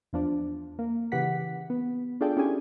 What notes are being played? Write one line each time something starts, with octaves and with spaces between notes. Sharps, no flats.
E2 F3 D4
A#3
C#3 E3 G4 F#5 B6
B3
D4 F4 G#4 A4 D5 G5
C#4 E4 G4 G#4 G#5